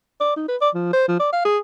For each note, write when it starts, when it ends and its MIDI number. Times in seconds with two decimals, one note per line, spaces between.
0.21 0.35 74
0.36 0.45 63
0.48 0.56 71
0.61 0.70 74
0.75 0.90 53
0.93 1.07 72
1.08 1.19 53
1.20 1.32 74
1.33 1.43 77
1.45 1.59 68